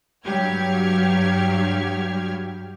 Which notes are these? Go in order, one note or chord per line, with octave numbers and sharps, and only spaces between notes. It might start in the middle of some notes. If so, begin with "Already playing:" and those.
G2 F#3 G4 F6 G#6